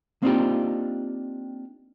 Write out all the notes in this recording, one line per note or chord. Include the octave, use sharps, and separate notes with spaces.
A#3 C4 D4 D#4 F4 G4